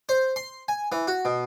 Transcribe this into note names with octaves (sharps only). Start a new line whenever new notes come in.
C5
C6
G#5
E3
F#4
B2